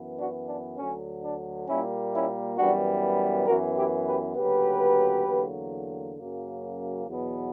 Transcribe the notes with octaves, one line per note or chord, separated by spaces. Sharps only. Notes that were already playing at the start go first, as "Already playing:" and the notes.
Already playing: F#2 E3 B3
D4 F#4
D4
D2 D3 F#3 C#4
D4
A#2 G3 A#3 C#4 E4
C#4 E4
F#2 E3 G3 B3 D4 F#4
F#2 E3 B3 F#4 A#4
E4 G4
G4 B4
D2 C#3 F#3 A#3 G4 B4
E2 D3 F#3 A#3
F#2 C#3 F#3 A#3
E2 B2 F#3 B3